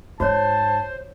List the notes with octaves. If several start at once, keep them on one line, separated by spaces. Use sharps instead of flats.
G#2 F#4 C5 C#5 A5